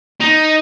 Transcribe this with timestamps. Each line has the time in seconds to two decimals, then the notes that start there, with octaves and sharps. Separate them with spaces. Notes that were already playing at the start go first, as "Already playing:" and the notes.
0.20 D#4